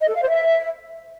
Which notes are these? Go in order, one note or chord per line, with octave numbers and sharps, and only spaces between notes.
D#5
A4
F5
C5
E5